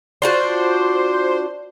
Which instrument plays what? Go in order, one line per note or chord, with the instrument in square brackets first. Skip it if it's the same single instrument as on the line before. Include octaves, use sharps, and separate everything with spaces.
[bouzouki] D4 F4 F#4 [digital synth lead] C5